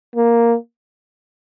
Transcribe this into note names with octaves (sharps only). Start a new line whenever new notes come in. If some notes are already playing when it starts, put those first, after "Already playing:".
A#3